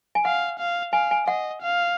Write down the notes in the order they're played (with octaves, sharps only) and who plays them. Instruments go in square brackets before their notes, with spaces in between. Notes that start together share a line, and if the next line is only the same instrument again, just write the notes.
[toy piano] G#5
[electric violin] F5 [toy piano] F#5
[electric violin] F5
[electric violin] F5 [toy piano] G#5
[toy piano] G#5
[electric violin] D#5 [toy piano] F#5
[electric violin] F5